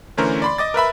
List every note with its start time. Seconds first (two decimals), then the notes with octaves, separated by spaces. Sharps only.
0.17 D3 E3 A3 C#4 A#4 C5
0.42 D5 B5 C6
0.58 D#5 D6 A6
0.74 A#4 B4 E5 B5